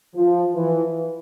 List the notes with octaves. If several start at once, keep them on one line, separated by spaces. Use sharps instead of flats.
F3
E3